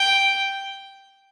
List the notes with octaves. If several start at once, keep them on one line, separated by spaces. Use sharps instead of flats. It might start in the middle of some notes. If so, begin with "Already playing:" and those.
Already playing: G5